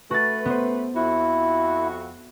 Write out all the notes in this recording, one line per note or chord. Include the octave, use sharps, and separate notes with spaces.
A3 F#4 B4 A6
B3 C5
F2 E4 F#4